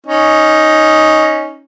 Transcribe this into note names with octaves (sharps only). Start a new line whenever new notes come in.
C#4 D#4